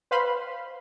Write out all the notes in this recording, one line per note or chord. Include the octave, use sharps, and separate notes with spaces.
B4 C5 F5 B5 C6